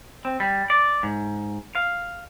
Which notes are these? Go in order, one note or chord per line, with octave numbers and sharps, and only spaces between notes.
C4
G3
D5
G#2
F5